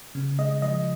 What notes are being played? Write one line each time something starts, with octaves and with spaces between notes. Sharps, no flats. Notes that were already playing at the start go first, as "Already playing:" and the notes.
C#3
G#3 D#5
F3 D#5